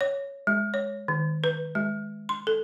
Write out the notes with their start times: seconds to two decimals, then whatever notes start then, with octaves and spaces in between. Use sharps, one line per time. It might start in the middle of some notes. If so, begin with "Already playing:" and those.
0.01 C#5
0.47 G#3
0.74 C#5
1.08 D#3
1.44 B4
1.75 G#3
2.29 C6
2.47 A4